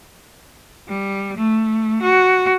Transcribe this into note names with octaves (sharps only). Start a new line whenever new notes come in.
G3
A3
F#4